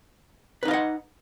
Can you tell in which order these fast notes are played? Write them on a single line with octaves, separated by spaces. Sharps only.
B4 D#4 F5 D#5 F#5